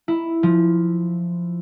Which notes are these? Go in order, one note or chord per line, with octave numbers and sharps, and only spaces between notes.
E4
F3